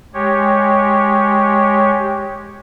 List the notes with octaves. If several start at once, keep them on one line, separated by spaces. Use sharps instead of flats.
G#3 G4 C#5